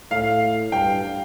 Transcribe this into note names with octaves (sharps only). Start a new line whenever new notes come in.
A2 F5
G2 G5